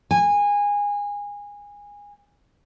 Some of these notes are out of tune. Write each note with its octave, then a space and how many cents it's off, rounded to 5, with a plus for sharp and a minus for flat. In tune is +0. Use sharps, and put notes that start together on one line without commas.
G#5 -20